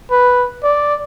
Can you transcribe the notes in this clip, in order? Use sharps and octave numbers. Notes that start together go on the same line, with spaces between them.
B4
D5